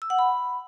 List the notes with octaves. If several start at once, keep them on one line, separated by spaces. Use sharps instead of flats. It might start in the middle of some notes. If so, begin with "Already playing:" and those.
E6
F#5
B5